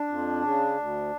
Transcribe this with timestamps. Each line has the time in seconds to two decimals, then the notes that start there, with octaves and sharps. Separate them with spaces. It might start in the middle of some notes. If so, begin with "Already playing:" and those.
Already playing: D4
0.08 F2
0.42 C#3
0.77 D2